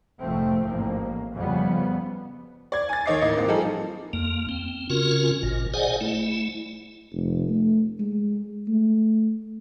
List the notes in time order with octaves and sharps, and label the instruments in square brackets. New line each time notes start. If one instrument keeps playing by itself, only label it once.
[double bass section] F1 G#2 F3 A3 C4
A1 G#2 A#3
F2 C#3 G3 B3
[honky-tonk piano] D5 G#6
G#5 A6
D#2 D#3 C#5 D#5 D6 C7
A1 A#3 D#5
G#2 A#3 C4
F3 G3 D#4 G#4 A4
[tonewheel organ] F2 A#3
C4
C#3 C#4 F4 F#4 A#4
G#1 A#2
G#4 C5 D5 D#5 F#5 G#5
A3 E4
[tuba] F1
A3
G#3
A3